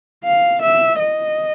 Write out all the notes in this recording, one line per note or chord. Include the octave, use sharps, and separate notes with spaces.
F5
E5
D#5